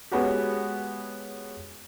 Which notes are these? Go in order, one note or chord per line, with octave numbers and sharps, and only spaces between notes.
G#3 B3 C#4 F#4 G4